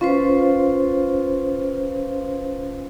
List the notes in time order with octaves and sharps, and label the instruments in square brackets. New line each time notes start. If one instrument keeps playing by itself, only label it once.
[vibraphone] C#4 B4 C5 [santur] F4